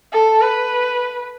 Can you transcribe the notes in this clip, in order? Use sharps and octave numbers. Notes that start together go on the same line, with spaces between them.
A4
B4